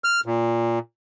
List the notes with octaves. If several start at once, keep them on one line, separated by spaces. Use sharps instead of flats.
F6
A#2